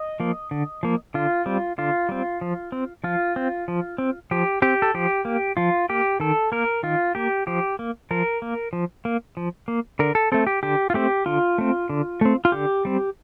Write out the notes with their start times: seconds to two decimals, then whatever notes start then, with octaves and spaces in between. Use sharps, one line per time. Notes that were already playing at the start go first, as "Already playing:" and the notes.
Already playing: D#5
0.20 F3 A#3
0.51 D3
0.83 F3 A#3
1.14 D3 F4
1.46 G3 C4
1.78 D3 F4
2.09 G3 C4
2.41 F3
2.72 C4
3.04 F3 F4
3.36 C4
3.68 F3
3.98 C4
4.31 F3 G4
4.62 C4 G4
4.82 A4
4.94 F3 G4
5.25 A#3
5.57 F3 F4
5.89 A#3 G4
6.20 D#3 A4
6.52 A#3 A#4
6.83 D#3 F4
7.15 A#3 G4
7.47 F3 G4
7.79 A#3
8.11 F3 A#4
8.42 A#3
8.73 F3
9.05 A#3
9.37 F3
9.68 A#3
9.99 D3 A#4
10.15 A4
10.32 A3 C4 A4
10.47 G4
10.63 D3 G4
10.90 F4
10.94 A3 C4 G4
11.26 D3 F4
11.58 A3 C4
11.89 D3
12.21 A3 C4
12.45 F4
12.52 D3 G4
12.85 G3 C4